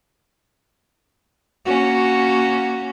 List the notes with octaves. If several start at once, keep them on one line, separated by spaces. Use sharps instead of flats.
A#3 C#4 F#4